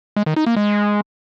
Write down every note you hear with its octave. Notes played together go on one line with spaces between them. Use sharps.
G#3
D#3
D#4
A#3
G#3